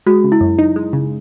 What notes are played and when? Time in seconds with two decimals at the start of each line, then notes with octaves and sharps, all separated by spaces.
0.06 G#3 F#4
0.24 C#3
0.32 E4
0.41 F#2
0.58 D#4
0.76 G#3
0.93 C#3